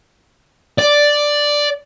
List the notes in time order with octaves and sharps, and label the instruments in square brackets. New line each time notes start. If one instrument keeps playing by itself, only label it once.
[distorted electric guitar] D5